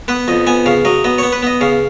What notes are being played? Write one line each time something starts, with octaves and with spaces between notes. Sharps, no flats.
B3 B4
F2 D#5
B3 G#5
C#3 F5
F#3 D#5
B3 D#5
B3 C#5
B4
B3 D#5
C#3 F5